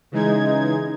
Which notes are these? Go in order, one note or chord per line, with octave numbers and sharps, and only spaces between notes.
C#3 E3 G#3 D#4 G#6